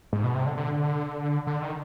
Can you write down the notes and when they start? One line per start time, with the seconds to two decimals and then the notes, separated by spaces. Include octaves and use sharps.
0.13 G#2
0.24 B2
0.34 C3
0.46 D3
0.57 D3
1.47 D3
1.63 D#3